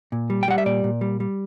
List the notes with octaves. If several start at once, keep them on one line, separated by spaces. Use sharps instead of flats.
A#2
G3
G5
G3 F#5
E5
A#2 D5
A#2
G3
G3